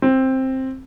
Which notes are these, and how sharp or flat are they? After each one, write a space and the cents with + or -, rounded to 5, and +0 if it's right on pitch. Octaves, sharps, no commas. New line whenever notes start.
C4 +10